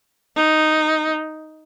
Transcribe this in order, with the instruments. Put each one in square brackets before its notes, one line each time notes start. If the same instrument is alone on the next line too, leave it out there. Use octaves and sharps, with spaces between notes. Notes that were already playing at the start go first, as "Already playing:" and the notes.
[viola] D#4